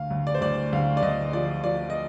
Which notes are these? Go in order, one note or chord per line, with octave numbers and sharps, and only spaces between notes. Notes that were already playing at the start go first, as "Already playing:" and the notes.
Already playing: D2 F5
D2
D5
C5
D2 D5
D2 F5
D5
D2 D#5
F3 D5
F3 D5
D#5